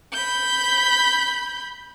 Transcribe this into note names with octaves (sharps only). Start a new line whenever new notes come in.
B5 G6